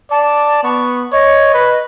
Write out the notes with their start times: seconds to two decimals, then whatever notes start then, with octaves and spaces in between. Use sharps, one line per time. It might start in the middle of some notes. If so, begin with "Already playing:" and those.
0.11 D5 A5
0.63 B3 C#6
1.12 C#5 D#5
1.54 B4